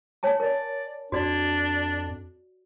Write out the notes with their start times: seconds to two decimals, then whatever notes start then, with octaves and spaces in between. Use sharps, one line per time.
0.23 C#5 G#5 A5
0.40 A#4 D5
1.12 F2 D4 F#4 D5